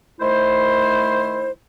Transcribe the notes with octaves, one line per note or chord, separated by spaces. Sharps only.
D#3 A3 E4 C5